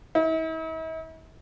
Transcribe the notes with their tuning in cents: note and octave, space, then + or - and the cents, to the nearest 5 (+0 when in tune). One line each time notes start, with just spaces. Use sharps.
E4 -45